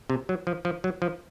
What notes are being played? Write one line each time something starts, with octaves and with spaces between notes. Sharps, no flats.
C3
F#3
F3
F3
F#3
F3